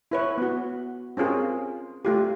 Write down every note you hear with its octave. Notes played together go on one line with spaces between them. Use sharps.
E4 B4 C#5
B3 F#4
C4 C#4 F4 G#4 A#4
A3 F4 G4